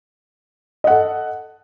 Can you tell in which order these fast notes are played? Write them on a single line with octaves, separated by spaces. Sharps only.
D#5 F#5 A4